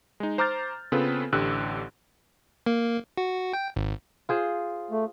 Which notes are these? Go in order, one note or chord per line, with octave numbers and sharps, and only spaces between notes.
G#3 D#4
C5 A#5 D6 F6 G6 A6
C#3 B3 C4 F4 A4 B4
A1 D3 G4 E6 F#6
A#3
F#4
G5
G#1
F4 G#4 C5
A3